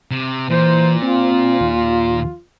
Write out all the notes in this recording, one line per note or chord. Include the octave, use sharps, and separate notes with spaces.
C3
A#2 E3 C5
C4 F4
D#2